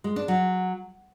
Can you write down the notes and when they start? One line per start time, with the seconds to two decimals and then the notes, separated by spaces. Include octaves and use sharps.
0.04 G#3
0.16 D4
0.28 F#3